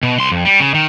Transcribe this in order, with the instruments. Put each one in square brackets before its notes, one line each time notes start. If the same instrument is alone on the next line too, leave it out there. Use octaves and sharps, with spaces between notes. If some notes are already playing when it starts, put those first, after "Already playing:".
[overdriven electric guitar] B2
C2 C6
F2
G3
C#3
D#3